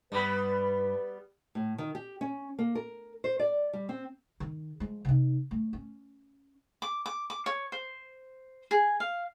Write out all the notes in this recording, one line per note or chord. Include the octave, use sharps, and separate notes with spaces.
G2 G3 B3 B4 B5
A2
D#3
G4
C#4
A#3
A#4
C5
D5
G3
C4
D#3
F3 G#3
C3 D#4
A3
C#4
D6
D6
D6
C#5
C5
G#4
F5